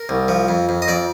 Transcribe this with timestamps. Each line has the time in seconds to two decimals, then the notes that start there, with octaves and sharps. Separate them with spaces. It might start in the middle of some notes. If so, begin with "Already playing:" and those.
Already playing: A#4
0.09 C2
0.28 F3
0.48 F2
0.69 F2
0.82 D#5
0.88 F2 D5